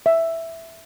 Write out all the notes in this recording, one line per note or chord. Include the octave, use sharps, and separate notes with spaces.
E5